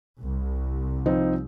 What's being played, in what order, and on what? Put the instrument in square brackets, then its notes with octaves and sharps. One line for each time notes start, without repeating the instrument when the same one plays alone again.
[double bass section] C2
[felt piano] F3 C4 D#4